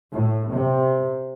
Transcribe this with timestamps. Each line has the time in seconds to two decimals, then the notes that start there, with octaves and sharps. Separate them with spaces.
0.12 A2
0.51 C3